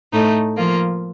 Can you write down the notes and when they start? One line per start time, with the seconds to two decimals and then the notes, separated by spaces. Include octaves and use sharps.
0.13 A2 A3 D#4
0.57 F3 A#3 F4